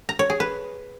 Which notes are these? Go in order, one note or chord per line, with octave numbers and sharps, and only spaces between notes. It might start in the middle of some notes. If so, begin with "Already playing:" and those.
A#5
C#5
G#4
B4